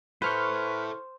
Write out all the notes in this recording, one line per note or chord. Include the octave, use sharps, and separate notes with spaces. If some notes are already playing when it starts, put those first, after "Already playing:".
E4 A4 B4 C5 C#6 F6 G6